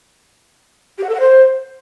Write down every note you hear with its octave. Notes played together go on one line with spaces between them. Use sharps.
G4
F#5
A4
F#5
C5